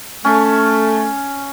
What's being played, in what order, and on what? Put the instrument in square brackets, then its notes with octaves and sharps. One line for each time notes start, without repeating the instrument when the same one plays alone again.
[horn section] A3 [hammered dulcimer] C#4